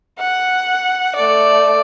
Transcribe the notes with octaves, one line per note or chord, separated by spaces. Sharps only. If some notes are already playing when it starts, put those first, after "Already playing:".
F#5
A3 D5